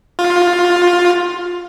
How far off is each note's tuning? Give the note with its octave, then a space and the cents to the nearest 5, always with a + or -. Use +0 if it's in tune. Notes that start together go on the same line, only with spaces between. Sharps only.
F4 +15